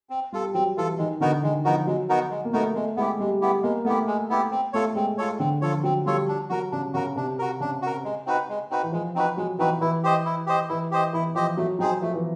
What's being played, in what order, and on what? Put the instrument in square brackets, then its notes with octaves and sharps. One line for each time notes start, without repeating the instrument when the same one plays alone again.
[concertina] C4
[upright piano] G3 [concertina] F4 A4
[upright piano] F#3 [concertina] C4
[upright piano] E3 [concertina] F4 A4
[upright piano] D#3 [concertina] G#3
[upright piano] D3 [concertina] B3 D#4 F#4 A#4
[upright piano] D#3 [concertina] G#3
[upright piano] F3 [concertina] B3 D#4 F#4 A#4
[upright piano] F#3 [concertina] G#3
[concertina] B3 D#4 F#4 A#4
G#3
[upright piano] A#3
[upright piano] A3 [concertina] B3 D#4 F#4 A#4
[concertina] G#3 [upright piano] A3
[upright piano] G#3 [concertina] B3 E4 G4
[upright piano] G3 [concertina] G#3
[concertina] B3 E4 G4
[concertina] G#3 [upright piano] A#3
[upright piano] A3 [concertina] B3 E4 G4
[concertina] G#3
B3 E4 G4
C4
[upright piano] A3 [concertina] F4 A4 C#5
[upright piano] G#3 [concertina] C4
[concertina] F4 A4 C#5
[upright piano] D3 [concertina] C4
[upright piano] F3 [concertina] F4 A4 C#5
[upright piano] F#3 [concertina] C4
[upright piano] G3 [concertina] F4 A4 C#5
[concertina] D4
[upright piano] F#3 [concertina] F#4 A#4
[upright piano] C#3 [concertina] D4
[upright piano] C#3 [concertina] F#4 A#4
[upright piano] C3 [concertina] D4
[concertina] F#4 A#4
[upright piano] C#3 [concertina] D4
[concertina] F#4 A#4
G#3
C4 D#4 F#4 B4
G#3
C4 D#4 F#4 B4
[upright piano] E3
[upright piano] F3 [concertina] G#3
[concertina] C4 D#4 F#4 B4
[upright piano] F#3 [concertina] G#3
[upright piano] E3 [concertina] C4 D#4 F#4 B4
[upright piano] E3 [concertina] E4
[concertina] G4 C5 D#5
E4
G4 C5 D#5
[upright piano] E3 [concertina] E4
[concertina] G4 C5 D#5
[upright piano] E3 [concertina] E4
[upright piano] F3 [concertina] G4 C5 D#5
[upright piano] F#3 [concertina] A3
[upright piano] F#3 [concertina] C4 D#4 G#4 C5
[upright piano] F3 [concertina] A3
[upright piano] E3